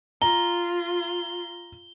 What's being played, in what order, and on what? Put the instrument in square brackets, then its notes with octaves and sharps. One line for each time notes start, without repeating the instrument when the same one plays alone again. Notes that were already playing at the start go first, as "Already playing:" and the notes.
[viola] F4 [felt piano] A#5 [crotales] G7